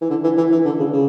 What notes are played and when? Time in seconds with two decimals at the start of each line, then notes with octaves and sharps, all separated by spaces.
0.01 E3
0.10 D3
0.24 E3
0.37 E3
0.52 E3
0.65 D3
0.79 C#3
0.93 C#3